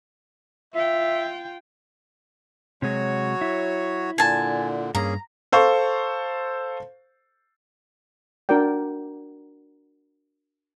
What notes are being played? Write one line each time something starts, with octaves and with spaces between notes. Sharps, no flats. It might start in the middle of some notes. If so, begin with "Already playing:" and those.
F4 E5 G5
C3 F#3 G#3 F#4 C#5
E4
A#2 D3 G#5 A5
G2 A#3 C#4 G#4 A#5
A4 C5 F5 C#6
D4 F#4 A#4 D5 G5